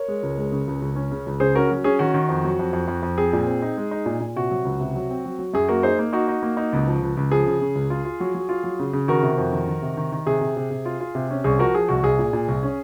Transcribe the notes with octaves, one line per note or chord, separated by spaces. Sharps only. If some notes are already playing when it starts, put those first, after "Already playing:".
Already playing: A#4 C#5
G#3
C#2
G#3
C#3
C#2
C#2
C#4
C#3
C#2
C#3 G#4 C5
C#4 F#4 A#4
F#3
C#4 G#4
D#3 F#4
D#3
F2
F#3
F2
F2
F2
F2
C4 G#4
A#2
C4
D#4
G#3
D#4
A#2
A#2
C3 F#4
F#3
C#2
C3
F#3
C4
F#3
F#3
F#2 G#4
A#3 F#4 A#4
D#4 G#4 C5
A#3
D#4 F#4
D#4
A#3
D#4
C#2
F3
C#2
C#2
F3 G#4
C#3
C#3
C#2
F4
F4
F#3
F#3
F4
F#3
C#3
C#3
D#3 F#4 A#4
C3
F2
D#3
D#3
C3
D#3
D#3
C3 G#4
C3
C3
C3
F4
F4
C3
C#4
C2 G#4
F3 F#4 A#4
F3 G#4
C2 F#4
C2 G#4
A#2
A#2
C2
C#4